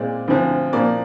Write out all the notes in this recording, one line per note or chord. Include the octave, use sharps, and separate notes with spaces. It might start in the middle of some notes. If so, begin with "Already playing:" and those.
Already playing: A#2 G#3 C4 D5
D2 D3 F3 C4
A#2 F3 A#3 D5